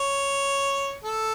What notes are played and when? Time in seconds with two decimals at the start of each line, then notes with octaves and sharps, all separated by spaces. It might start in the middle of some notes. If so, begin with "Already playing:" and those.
Already playing: C#5
1.04 A4